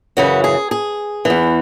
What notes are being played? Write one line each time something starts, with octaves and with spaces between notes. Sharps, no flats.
F#2 C#3 E3 F#4
G#4
G#4
E2 E3